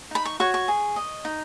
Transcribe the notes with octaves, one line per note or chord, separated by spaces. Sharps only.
D#4 B5
C#6
F#4 C#5 C#6
C#6
G#4
D#5
D#4